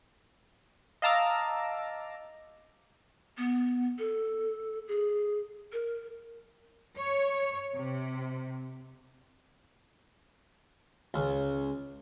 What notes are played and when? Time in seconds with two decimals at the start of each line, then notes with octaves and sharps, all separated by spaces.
1.02 D#5 F5 A5 A#5 D6 E6
3.38 B3
3.99 A4
4.88 G#4
5.73 A#4
6.97 C#5
7.75 C3
11.14 C#2